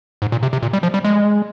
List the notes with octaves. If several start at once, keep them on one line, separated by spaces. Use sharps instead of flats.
G#2
A#2
C3
C3
A#2
G3
F3
G3
G#3